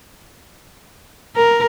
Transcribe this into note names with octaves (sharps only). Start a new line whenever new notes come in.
A#4